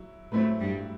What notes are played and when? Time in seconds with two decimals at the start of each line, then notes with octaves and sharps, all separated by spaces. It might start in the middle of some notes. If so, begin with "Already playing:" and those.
Already playing: F#3 E4
0.32 A2 F#3 A3 C4 E4 B4
0.60 G2 G3